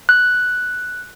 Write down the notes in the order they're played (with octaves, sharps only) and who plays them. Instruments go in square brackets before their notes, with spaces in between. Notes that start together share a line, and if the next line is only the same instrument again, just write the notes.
[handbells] F#6